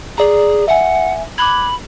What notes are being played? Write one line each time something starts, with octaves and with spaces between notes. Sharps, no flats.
G#4 D5 A#5
E5 F#5 G#5
B5 D6 F#6 G#6